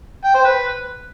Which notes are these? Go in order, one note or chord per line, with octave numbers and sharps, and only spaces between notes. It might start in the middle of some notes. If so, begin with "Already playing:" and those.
G5
C5
B4